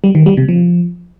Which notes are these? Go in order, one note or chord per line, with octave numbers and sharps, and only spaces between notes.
G3
D#3
G3
C3
F3